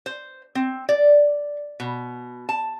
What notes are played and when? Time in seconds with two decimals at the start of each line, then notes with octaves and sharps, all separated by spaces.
0.06 C5
0.55 C4
0.89 D5
1.80 B2
2.49 A5